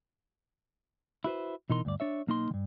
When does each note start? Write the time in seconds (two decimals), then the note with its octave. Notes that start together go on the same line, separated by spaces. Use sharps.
1.24 E4 F#4 B4 C5
1.70 B2 E3 D#4 A#4 C6
1.85 D2 G2 D5
2.00 D4 C#5 E5
2.27 B1 A#3 D#4 C6
2.51 G2 D#3